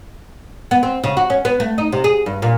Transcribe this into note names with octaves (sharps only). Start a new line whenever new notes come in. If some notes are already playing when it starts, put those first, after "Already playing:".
B3
C4
C#3
F#4
C#4
B3
A3
D#4
C3
G#4
G2
A#2